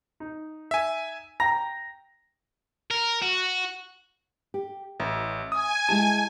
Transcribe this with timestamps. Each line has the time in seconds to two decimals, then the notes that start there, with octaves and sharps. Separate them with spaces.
0.20 D#4
0.71 E5 G#5
1.40 G5 A#5 A#6
2.91 A#4
3.22 F#4
4.54 G4
5.00 A1 E5
5.52 G#5 D#6
5.89 G#3 E4 G4 A5